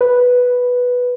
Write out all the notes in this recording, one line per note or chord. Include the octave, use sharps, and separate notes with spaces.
B4